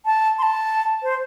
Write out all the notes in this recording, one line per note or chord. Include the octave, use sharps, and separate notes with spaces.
A5
C6
A5
C5